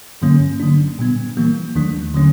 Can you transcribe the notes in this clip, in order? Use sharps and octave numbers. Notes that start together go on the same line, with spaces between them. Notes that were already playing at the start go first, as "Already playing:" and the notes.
G2 D3 F#3 A#3 C#4
D3 F#3 A#3 D4
A#2 G3 B3
E3 G3 A#3
D#2 D#3 F#3 A3 D4
D3 F#3 A3 C#4